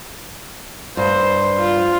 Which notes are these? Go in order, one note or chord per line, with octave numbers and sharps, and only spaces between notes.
G2 C5
F4